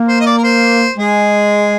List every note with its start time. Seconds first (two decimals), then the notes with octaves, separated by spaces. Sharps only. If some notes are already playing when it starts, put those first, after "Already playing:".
Already playing: A#3
0.08 C5
0.20 D#5
0.26 D5
0.38 A#4
0.44 C5
0.97 G#3 G#4